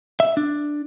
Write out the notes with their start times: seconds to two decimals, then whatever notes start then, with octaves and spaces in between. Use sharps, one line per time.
0.20 E5
0.37 D4